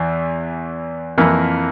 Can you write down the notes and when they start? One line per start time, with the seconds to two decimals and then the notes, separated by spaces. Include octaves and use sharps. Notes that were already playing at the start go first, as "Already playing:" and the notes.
Already playing: E2 E3
1.18 F2 E3 A#3 E4